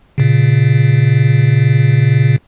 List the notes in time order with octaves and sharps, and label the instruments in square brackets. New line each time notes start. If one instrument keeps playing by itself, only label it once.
[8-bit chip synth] A#2 C#3